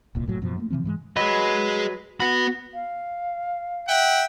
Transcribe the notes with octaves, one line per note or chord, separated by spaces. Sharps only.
D#1 C2 A#2
F#1 A2 F#3
F#2 B2 F3
A3 A#3
C3 E3 F3 C4
G#2 E3 F#3 G#3
F#3 G#4 B4 D#5
B3 F#4 B5
F5
E5 F#5 G5